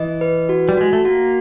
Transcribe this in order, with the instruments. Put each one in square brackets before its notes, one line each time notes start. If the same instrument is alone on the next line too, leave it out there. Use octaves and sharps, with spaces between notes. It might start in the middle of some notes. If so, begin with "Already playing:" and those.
Already playing: [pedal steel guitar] E3 [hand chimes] D#5
[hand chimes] B4
F#4
[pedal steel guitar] G3
[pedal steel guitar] G#3 [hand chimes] F#4
[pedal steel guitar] A3
[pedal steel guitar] A#3 [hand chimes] F#4